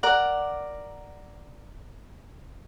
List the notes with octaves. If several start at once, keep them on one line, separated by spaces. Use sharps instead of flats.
A#4 D5 F#5